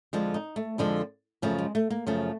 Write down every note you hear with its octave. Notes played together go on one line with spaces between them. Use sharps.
F2 D3 F3 G#3
D#4
A3
F2 D3 F3 G#3
F#2 C#3 F3 A3
G#3
A3
A#3
F#2 C#3 F3 A3